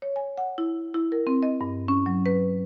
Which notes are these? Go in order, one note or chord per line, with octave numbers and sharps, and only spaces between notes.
C#5
G#5
F#5
E4
E4
A#4
C4
D#5
G2
C#4
F#3
B4